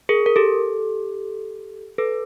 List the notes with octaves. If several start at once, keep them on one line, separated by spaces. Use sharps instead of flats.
G#4 A#4
A#4
G4 A4
A4 B4